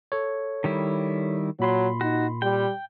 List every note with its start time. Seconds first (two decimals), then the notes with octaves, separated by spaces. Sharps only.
0.12 A4 C#5
0.64 D#3 G3 E4
1.60 A#2 F#3 B5 C6
2.01 D#4 F#4
2.42 G3 G5